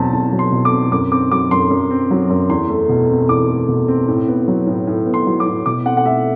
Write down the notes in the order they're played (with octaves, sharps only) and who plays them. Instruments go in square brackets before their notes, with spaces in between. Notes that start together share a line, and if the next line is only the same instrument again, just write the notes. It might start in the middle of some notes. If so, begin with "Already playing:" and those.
Already playing: [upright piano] E2 B2 F#3 C4 A5
E2 A5
F#3
C6
B2
D6
C4
F#2 D6
C4 D6
F#3 D6
F#2 C6
F#2
C4
F#3
F#2
E2 C6
A3
B2
C4
E2 D6
A3
B2
C4
A2
B3
F#3
A2
A2
B3
C6
F#3
D6
A2
B2 D6
C4 F#5
F#5
A3 E5